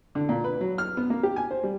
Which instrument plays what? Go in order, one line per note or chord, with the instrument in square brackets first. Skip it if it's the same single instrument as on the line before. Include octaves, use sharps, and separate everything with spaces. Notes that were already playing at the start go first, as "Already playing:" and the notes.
[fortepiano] D3
A#2
B4
F#3
F6
B3
A#3
G4
G#5
C5
G3